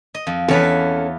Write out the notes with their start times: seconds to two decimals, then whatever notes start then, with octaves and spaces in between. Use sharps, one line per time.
0.14 D#5
0.27 F2
0.48 E2 C#4 F4 A4 B4